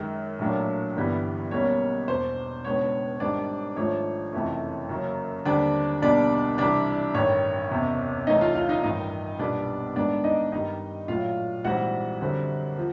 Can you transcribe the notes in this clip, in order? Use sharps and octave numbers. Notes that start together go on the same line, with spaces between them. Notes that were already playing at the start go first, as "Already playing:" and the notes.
Already playing: F#2 D#3 G#3
A#1 A2 F#3 A#3 D4
G1 G2 E3 G3 B3
B1 B2 G3 A#3 C#4 C#5
E1 E2 B2 C5
C#2 B2 G#3 B3 D4 C#5
G#1 G#2 D#3 G3 C4 D4 D5
G#1 G#2 F3 A3 D4 C#5
F#1 F2 C3 E3 A3
F#2 C#3 F#3 A#3
D#2 D3 G3 C4 D4 D5
B1 B2 G3 A#3 D4 D5
C2 C3 E3 G3 D4 D5
A1 G2 D#3 C#5
F#1 E2 C3
C2 C3 E3 A3 C#4 D#4 D#5
F4 F5
F4 F5
D#4 D#5
A1 G2 D#3 D#4 D#5
B1 A#2 G3 B3 D4 D5
A1 G#2 D#3 G#3 B3 D4 D5
D#4 D#5
G2 D#3 G3 D#4 D#5
A#1 A2 F#3 F4 F5
A#1 G#2 E3 G3 C4 F#4 F#5
F#2 D3 G3 C4
F3